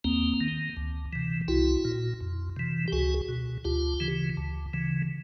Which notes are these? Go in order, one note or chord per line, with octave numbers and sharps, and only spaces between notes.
D#2 A#3 C4
D#3
D2
C3 E3
C2 E4 F#4
A#2
F2
C3 E3
G4
C#2 F#4 G#4
B2
D2 F4 G4
C#3 E3
D2
C#3 E3